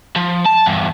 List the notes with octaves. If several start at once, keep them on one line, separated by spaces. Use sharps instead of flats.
F3
A5
E2 G2